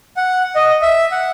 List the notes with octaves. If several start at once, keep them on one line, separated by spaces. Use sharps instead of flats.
F#5
D#5
E5
F#5